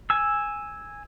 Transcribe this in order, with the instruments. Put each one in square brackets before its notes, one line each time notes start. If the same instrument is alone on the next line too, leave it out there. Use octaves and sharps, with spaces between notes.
[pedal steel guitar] G#5 E6